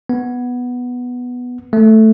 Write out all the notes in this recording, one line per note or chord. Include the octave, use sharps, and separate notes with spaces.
B3
A3